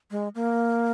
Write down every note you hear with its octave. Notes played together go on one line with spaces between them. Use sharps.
G#3
A#3